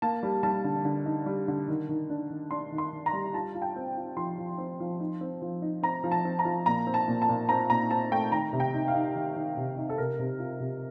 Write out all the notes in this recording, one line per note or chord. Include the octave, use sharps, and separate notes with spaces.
A#3 A5
G3
G3 A5
D3
D3
D#4
G3
D3
D#3
D#3
D4
D#3
D4 C6
D#3
C6
D#3
A#5
G3
F4 A5
F4
G5
C4
F4
F3 C6
F3
C4
F3
D#4
C4
F3
D#4
C4 A#5
F3
A5
C4
A#5
F3
A#2 A#5
C4
A5
A#2
A5
A#2
C4 A#5
A#2 A#5
C4 A5
A3 G5
D#3 A#5
C3
G5
D#4
F5
D#4
D#3
D#3
C3
D#4
A4
C3 A#4
C3
F4
C3